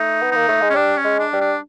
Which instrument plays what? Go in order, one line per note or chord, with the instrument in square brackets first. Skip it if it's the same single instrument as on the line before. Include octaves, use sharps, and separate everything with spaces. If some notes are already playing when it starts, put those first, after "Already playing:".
Already playing: [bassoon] A3 [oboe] D#4
[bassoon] B3
[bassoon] A#3 [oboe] D#4
[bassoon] A3
G#3
[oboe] C#4
[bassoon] G3 [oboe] D4
[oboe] C#4
[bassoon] G#3
[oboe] D4
[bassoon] G3
[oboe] D4